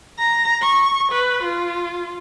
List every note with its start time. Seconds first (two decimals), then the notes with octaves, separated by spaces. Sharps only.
0.19 A#5
0.62 C#6
1.12 B4
1.43 F4